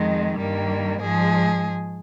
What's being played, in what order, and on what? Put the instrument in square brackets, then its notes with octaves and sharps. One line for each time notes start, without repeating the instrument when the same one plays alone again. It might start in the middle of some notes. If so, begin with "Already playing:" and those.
Already playing: [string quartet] F2 D#3 G#3
G2 D#3 G3 A#3
G#2 F3 G#3 G#4